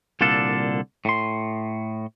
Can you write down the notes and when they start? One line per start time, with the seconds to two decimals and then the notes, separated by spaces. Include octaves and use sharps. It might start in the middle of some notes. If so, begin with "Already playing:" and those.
0.21 C2 A#2 D3 D4 A4 F5
1.05 A2 C6